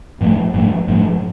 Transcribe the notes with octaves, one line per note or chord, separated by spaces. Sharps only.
G#2 F3 A3
G#2 F3 A3
G#2 F3 A3